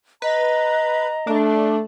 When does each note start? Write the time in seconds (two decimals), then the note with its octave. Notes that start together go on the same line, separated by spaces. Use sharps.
0.22 B4 D#5 A#5
1.27 A3 D4